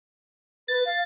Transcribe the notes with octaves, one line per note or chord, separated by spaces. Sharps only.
B4 A6
F5